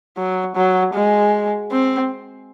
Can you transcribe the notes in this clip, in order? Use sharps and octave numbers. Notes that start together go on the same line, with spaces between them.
F#3
F#3
G#3
C4